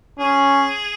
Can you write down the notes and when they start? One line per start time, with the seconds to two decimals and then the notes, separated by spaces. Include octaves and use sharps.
0.19 C#4 G#4